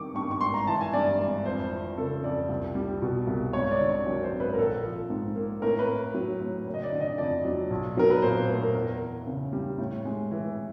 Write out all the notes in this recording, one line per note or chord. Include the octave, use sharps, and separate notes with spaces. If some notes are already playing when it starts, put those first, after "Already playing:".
Already playing: G2 D#3 G3 C#6 D6
G2 C#6
C#6
G#1 C6
A#5
E3 A5
G#5
G2 D5
G#1
F2 C5
E3
C#3 A4
F2 D5
C2
G3
B2
C2
G#1 C#5
D5
D3
C#5
F#2
C5
G#1
B4
A#4
A#1 A4
F3
G#2
A#3
A2 A#4
B4
A#3
F#3
A2
F#1
D#5
D5
D3
D#5
F2 D5
F#3
B1
F#3 A#4
B4
A#2 C5
C5
A3 B4
A#4
E2 A#4
E3
C#3
G3
A2
G#3
E3